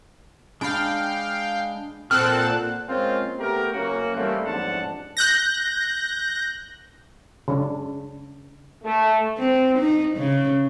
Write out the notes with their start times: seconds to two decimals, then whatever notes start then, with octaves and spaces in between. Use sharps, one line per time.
0.61 G#3 D4 F5 G5 B5
2.11 A#2 C4 A4 F#5 A5 F6 F#6
2.88 G#3 A#3 C4 C#4 F4
3.38 A3 B3 G4 A#4
3.73 F#1 F#2 A#3 C#4 F#4
4.15 E3 G3 A3 A#3 C4 C#4
4.44 A1 F2 G#2 D4 F#5 A5
5.17 F#6 G6 A#6
7.48 C#3 D4
8.84 A3
9.38 C4
9.79 D#4
10.17 C#3